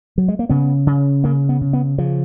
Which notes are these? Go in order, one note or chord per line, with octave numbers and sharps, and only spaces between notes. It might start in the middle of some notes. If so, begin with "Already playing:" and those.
F#3
G#3
A#3
C#3 B3
C#3
C#3 A#3
B3
C#3
B3
C#3 F3